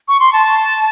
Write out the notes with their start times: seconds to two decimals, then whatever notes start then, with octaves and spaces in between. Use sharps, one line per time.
0.08 C#6
0.20 C6
0.33 A5